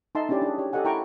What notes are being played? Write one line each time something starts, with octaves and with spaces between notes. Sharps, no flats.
D#4 A4 D#5 E5 A5 C6
C#4 D4 E4 G4 D5
D4 G#4
G4 C#5
G4 A4 D#5 F#5 G#5
E4 A#4 G5 A5 A#5 C#6